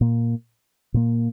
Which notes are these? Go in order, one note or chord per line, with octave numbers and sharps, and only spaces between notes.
A#2 A#3
A#2 A#3